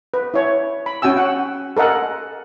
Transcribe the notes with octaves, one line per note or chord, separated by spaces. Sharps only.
B4
E4 C#5
B5
C#4 F#4 G5 G#5 E6
F#5
A4 A#4 D#5 F#5 G#5